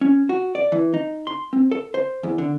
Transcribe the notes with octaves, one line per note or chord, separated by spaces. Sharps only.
C#4
F#4
D5
E3
D#4
C6
C4
A4
C5
E2
D3